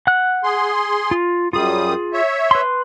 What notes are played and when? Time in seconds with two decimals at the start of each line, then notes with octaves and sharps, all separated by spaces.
0.07 F#5 F#6
0.44 G#4 C6
1.11 F4
1.53 F#2 G3 F4 G#4 D#6
2.13 C#5 E5
2.51 B4 C6